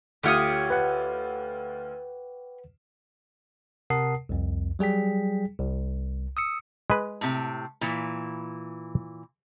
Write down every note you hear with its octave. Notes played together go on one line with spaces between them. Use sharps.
D2 F4 G4 C#5 D#6 F6
B4 F#5
C3 A#4 F#5 A5 D#6 C7
C2 F2
F#3 G3 G#4 G5 B6
C2
D#6 E6 C#7
G#3 B4
A2 C3
A#2 E3